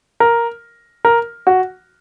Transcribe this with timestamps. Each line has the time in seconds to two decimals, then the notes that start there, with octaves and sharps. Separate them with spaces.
0.20 A#4
1.05 A#4
1.47 F#4